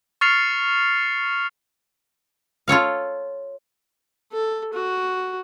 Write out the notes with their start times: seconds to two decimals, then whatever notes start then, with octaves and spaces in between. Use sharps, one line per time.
0.21 C#6 F6 A6 C7 C#7 F7
2.68 F4 A4 C#5 F5
4.33 A4
4.73 F#4